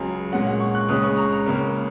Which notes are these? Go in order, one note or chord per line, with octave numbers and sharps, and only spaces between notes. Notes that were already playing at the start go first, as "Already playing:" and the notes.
Already playing: C#2 C#3 F#3 G#5
A#2 G#3 C#4 F#5
F#5
C#6
F#6
C#2 C#3 G#3 C#4 D#6
C#6
A#5
A#5
C#2 C#3 A#3 C#4